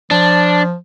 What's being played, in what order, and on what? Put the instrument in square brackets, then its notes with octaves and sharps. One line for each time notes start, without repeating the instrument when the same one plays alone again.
[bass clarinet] F3 [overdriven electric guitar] D4